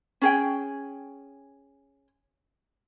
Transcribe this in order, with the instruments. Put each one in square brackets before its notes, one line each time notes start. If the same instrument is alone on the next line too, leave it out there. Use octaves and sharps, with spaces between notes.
[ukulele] C#4 G#4 G5